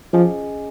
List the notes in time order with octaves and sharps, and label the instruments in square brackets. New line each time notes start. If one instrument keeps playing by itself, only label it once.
[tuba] F3 [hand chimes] C#4 G#4 D#5 G#5